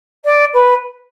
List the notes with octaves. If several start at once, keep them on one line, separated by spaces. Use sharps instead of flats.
D5
B4